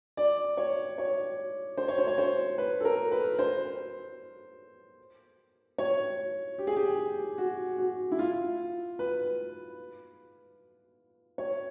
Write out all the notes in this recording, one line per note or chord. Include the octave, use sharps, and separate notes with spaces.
D5
C#5
C#5
C5
C#5
C5
C#5
C5
B4
A4
A#4
B4
C5
C#5
G4
G#4
G4
F#4
F#4
E4
F4
B4
C#5